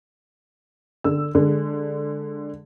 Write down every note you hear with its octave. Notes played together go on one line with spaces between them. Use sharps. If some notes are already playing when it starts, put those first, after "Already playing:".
D3 E6
D3 G#3